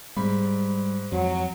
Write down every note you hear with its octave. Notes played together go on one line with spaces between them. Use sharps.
G#2 G3 B5
F2 F#3